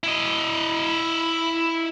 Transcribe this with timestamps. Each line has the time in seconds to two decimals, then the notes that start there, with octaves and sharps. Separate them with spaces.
0.04 E4 D#5